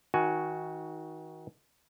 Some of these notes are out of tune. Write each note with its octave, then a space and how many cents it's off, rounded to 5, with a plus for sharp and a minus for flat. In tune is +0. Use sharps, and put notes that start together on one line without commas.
D#3 +35 F#4 +0 G#5 +10